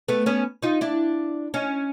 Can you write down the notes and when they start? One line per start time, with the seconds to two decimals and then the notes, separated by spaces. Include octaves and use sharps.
0.08 A3 B3
0.26 B3 C#4
0.63 D#4 F4
0.81 D4 E4
1.54 C#4 D#4